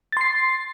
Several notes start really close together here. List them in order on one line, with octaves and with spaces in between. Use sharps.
A6 C6 C7